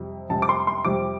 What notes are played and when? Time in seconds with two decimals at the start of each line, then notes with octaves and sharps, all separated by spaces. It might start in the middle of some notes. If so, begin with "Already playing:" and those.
Already playing: F2 C3 G3
0.29 F2 C3 G3 A5
0.42 D6
0.49 C6
0.67 C6
0.85 F2 C3 G3 D6